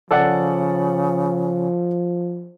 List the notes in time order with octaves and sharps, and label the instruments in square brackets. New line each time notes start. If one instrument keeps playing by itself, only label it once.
[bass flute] C#3 [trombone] F3 [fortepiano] A4 D5 F#5